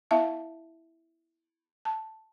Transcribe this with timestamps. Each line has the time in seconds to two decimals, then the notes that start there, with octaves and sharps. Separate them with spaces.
0.11 B3 E4 E5 F5 A5
1.85 A5